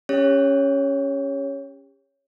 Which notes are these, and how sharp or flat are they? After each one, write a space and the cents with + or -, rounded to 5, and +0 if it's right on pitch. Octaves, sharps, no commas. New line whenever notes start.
C#4 +0 G4 +40 C#5 +0